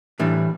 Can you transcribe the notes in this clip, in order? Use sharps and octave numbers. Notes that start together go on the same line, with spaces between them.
A2 E3 G3 D4